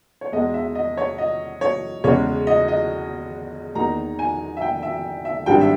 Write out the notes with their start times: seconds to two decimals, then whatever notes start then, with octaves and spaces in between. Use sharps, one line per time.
0.21 C#5
0.32 E2 B2 G#3 D#5
0.54 E5
0.75 D#5
0.97 C#5
1.18 D#5
1.61 C#5
2.04 E2 C#3 G#3 C#5
2.47 D#5
2.68 D#5
3.75 E2 D#3 A#3 D#4 A#5
4.19 G#5
4.57 E5
4.61 G5
4.83 E5
5.25 E5
5.46 G#1 G2 G3 G5
5.61 E5